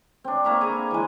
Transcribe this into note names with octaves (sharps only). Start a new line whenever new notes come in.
C4 D4
A#3 E5 A#5 C#6
G#4 G#5 A#5 B5
E3 G#3